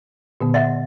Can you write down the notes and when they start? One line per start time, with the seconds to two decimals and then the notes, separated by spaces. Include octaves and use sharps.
0.41 A#2 D3 B3
0.54 D#5 E5 F#5